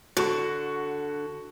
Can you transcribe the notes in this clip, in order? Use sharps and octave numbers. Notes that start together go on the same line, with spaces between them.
D3 F#4 C#6